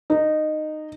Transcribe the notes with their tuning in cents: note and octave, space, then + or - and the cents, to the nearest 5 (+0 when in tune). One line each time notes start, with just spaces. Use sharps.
D#4 -15